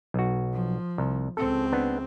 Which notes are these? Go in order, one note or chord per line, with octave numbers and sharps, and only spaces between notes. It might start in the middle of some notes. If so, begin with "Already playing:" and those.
B1 F#4
F3
C2
C#2 C4 A4
B3 D4